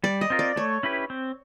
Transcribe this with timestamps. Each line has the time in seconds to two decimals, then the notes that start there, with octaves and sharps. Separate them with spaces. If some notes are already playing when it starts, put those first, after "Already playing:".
0.03 G3 D5
0.21 D#5
0.30 C4 F4 A#4
0.39 D5
0.56 A3 C#5
0.83 C#4 E4 G4 B4
1.10 C4